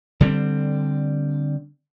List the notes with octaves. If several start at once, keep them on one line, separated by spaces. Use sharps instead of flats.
D3 G3 B3 C4